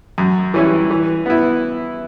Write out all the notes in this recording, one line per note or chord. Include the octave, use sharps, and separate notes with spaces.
F#2
E3 G3 C#4 E4
E3
B3 E4